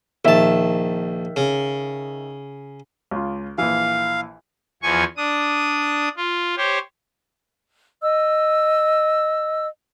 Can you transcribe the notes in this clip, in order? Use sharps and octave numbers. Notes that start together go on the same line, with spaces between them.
A#1 D#3 E5 A5
C#3
C#2 F4
A#1 E3 F5
E2 F3 G#5 C#6
D4 D#6
F4
G4 C5 C#5
D#5 E6